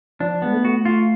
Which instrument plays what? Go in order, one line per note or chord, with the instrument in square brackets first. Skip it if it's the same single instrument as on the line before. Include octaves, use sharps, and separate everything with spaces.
[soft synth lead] F3 [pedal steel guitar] D4
[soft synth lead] G#3 [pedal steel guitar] B3
[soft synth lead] A3
[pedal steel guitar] F#4
F4